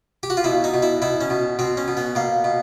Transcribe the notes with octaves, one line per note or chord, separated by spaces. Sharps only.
G4
F#4
F4
B2 E4
D#4
B2
E4
B2 E4
C#4
B2
B2 C4
C#4
B2
B3
B2 A#3
B2